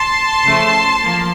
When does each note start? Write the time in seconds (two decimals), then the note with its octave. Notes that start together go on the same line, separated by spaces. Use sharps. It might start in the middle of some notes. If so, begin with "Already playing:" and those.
Already playing: A5 C6
0.44 C#3 F3 A3
1.03 F3 A#3